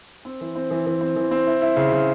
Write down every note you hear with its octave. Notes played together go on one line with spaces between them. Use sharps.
C4
E3
C4
E3
E3
C4
E3
C4
E4
E4
C#3
C#3